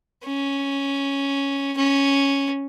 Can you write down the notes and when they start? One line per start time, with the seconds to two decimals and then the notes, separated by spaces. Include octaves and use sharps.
0.25 C#4
1.77 C#4